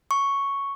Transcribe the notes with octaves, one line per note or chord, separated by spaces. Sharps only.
C#6